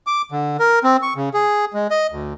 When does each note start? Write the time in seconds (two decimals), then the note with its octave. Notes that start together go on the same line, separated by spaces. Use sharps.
0.07 D6
0.32 D3
0.60 A#4
0.84 C4
1.02 C#6
1.16 C#3
1.34 G#4
1.74 G#3
1.91 D#5
2.12 D2